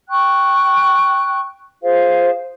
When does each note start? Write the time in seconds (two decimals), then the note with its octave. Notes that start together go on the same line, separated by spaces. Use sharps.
0.09 G5 C#6 F#6
1.82 F4 G#4 C5 F5